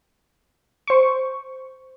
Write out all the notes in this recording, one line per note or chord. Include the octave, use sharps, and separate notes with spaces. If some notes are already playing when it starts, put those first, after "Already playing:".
C5 C#6